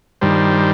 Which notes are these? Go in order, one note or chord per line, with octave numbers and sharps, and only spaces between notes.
G2 D#3 G3 C5